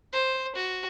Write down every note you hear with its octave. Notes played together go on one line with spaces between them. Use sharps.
C5
F#4